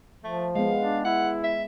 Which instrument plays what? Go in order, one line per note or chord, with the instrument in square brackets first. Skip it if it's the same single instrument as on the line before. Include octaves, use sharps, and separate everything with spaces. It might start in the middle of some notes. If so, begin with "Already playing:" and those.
[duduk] F3 [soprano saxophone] A3
[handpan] G#3 B3 [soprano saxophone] F5
[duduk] D4
[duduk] E4 [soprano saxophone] F#5
[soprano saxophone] E5